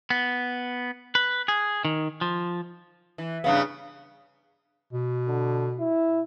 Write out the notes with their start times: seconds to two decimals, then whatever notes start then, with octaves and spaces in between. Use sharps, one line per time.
0.10 B3
1.15 B4
1.48 G#4
1.85 D#3
2.21 F3
3.18 E3
3.44 G2 C#3 B3 F5
4.93 B2
5.27 D3
5.79 E4